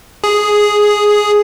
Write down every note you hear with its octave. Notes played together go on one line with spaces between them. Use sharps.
G#4